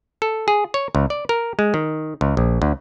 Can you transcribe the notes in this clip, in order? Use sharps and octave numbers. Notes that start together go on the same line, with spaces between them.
A4
G#4
C#5
C#2
D5
A#4
G#3
D#3
C#2
A#1
D2